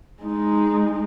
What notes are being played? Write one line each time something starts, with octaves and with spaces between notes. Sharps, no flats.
G#3 D#4